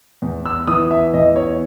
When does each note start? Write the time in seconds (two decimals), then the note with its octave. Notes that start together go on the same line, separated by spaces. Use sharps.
0.22 E2
0.45 E6
0.67 E3 D#6
0.91 E5
1.14 E2 D#5
1.36 C#5